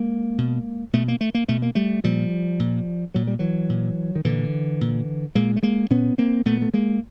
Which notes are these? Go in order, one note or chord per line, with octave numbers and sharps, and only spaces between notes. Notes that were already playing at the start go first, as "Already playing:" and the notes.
Already playing: G#3 A#3
B2
B2 A3
A#3
A3
A#3
B2 A3
A#3
G3 A3
A#2 F3 G3
A#2
A#2 F#3
G3
E3 F#3
A#2
D#3
A#2 D3 E3
A#2
A#2 G#3 A#3
A3
G#3 A#3
A#2 B3 C#4
A#3 C4
A#2 A3 B3
A3
G#3 A#3